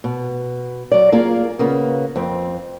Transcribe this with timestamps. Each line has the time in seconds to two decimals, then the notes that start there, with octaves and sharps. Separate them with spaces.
0.04 B2
0.92 F#3 D5
1.12 A#3 F4 G#4 A#4
1.59 C#3 A#3 B3
2.16 F2 C4